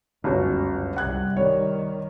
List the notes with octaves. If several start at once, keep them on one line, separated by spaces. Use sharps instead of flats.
G1 C#2 F#2 C#4 F#4
C2 C3 F#5 F#6 G#6
D#3 G3 C#5